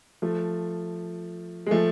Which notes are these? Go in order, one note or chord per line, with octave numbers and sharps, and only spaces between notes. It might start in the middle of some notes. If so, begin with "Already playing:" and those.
F3 A3
G#3
F3 A3